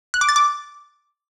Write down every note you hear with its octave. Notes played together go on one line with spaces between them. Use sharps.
F#6
D6
A6
D6